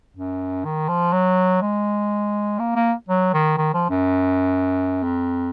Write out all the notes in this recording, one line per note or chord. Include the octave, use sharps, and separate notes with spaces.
F#2
D#3
F3
F#3
G#3
A#3
A#3
F#3
D#3
D#3
F3
F#2
F2